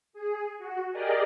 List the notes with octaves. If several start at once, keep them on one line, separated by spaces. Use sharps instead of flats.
G#4
F#4
G4 G#4 A#4 D5 D#5